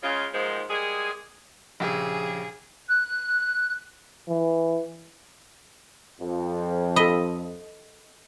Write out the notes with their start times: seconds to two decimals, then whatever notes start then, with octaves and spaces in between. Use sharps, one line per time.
0.03 C#3 G#3 F4
0.33 D#2 G#2 D#3 F3 G#3 C5
0.69 G3 G#3 A#3 G#4
1.80 A#1 C#3 G4 G#4
2.88 F#6
4.28 E3
6.20 F2
6.96 A4 D#5 B5